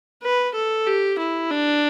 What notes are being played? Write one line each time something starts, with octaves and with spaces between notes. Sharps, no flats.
B4
A4
G4
E4
D4